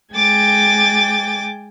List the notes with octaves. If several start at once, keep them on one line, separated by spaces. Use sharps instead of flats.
G#3 G5 G#5 D6 A6